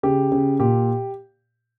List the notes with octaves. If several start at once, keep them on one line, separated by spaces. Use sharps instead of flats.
C#3 G4
C#3
A#2 G4